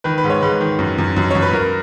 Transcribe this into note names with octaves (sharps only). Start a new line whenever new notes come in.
D#3 B4
B4
G#2
C#5
G#2 B4
D#3
F#2
F#2
F#2
F#2 C#5
B4
F#2 A#4